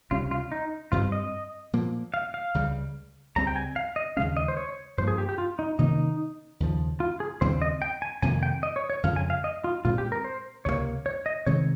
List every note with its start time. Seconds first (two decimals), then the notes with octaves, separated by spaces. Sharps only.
0.11 C#2 C3 G3 C#4 F4
0.31 F4
0.52 D#4
0.92 G2 G3 C4 F4
1.12 D#5
1.73 A#2 F3 A#3
2.14 F5
2.34 F5
2.54 C#2 C#3 G3
3.36 C#2 C#3 G3 C4 A#5
3.47 G5
3.56 G#5
3.76 F5
3.96 D#5
4.17 D#2 C#3 G#3 C#4 F5
4.37 D#5
4.48 C5
4.57 C#5
4.98 G2 F3 A#3 C5
5.08 G#4
5.18 G4
5.29 G4
5.38 F4
5.59 D#4
5.79 C3 D#3 A#3 C#4 D#4
6.60 D#2 C#3 F3
7.00 F4
7.20 G#4
7.41 D#2 C#3 G3 C4 C5
7.62 D#5
7.82 G5
8.02 G#5
8.22 F2 C3 D#3 A#3 G#5
8.43 G5
8.63 D#5
8.76 C#5
8.90 C#5
9.03 F2 C#3 F3 G#3 F5
9.16 G#5
9.30 F5
9.44 D#5
9.64 F4
9.85 A#2 G#3 C4 F4
9.98 G4
10.12 A#4
10.24 C5
10.65 C#2 C3 D#3 A#3 C#5
11.06 C#5
11.26 D#5
11.46 C3 D#3 G#3 C4 C#5